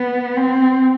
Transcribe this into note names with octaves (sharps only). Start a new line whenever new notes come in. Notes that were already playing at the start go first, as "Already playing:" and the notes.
Already playing: B3
C4